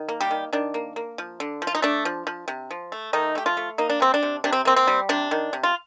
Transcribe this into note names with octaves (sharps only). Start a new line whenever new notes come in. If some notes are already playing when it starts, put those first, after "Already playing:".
Already playing: D#3
A#3
G3 G4
D#3
D#3 D4
A#3
A#3
F3
D3
F3
F4
D#4
A3 D4
F3
F3
C3
F3
A3
D#3 A3 D#4
A3 G4
F3 F4
A3
A#3 D#4
D4
C3 C4
D4
C3
C3 D4
C4
A#3 C4
C4
G3
C3 D4
D#3
C3
F4